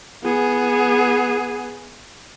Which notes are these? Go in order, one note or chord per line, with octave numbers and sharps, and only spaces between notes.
B3 G#4